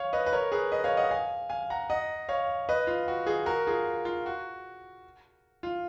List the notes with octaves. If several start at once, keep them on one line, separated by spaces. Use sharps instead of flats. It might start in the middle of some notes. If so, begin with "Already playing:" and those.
Already playing: C#5 F5
B4 D#5
B4
A#4 C#5
G#4 B4
B4 D#5
C#5 F5
D#5 F#5
F5 G#5
F5 G#5
F#5 A#5
D#5 F#5
C#5 F5
B4 D#5
F4
F#4
F4 G#4
F#4 A#4
F4 G#4
F4
F#4
F4